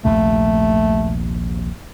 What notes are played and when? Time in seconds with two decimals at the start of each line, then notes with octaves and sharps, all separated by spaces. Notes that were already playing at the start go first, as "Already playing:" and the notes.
0.05 A#1 D#2 C3 A3